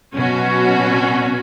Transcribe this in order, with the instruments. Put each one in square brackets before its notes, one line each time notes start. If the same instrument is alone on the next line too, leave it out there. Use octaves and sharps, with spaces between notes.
[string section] B2 F#3 C#4 F#4